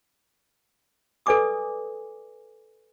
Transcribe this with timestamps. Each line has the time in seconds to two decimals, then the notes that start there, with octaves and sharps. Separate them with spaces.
1.26 A4 B4 D5 G#5 D6 D#6